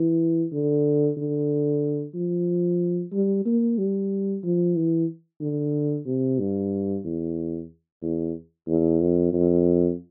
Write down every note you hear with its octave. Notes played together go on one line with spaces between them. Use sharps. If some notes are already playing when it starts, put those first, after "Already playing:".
Already playing: E3
D3
D3
F3
G3
A#3
G3
F3
E3
D3
C3
G2
E2
E2
E2
F2
F2